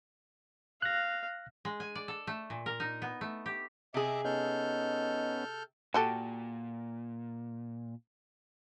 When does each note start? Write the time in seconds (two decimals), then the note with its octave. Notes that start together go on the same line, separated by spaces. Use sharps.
0.82 F5 F#6 A#6
1.65 G#3
1.80 G#5
1.95 D5
2.08 A4
2.27 A3
2.50 A#2
2.66 A#4
2.80 D#4
3.02 B3
3.21 A3
3.46 G4
3.94 C3 G#4 D#5 E5 D6
4.25 B3 C#4 D#4 A4 F6 G6
5.94 A#2 F#4 G4 A4